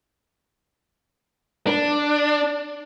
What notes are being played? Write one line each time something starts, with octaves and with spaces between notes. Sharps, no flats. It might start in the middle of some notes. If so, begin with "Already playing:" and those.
D4